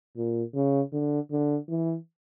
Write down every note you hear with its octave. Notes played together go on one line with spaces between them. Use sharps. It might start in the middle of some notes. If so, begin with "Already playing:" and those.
A#2
C#3
D3
D3
E3